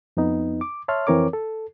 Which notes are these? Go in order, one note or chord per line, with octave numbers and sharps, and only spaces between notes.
F2 B3 D#4
D6
C#5 E5 A5 C6 F6
F2 E3 C4 A#4 C#5 D6
A4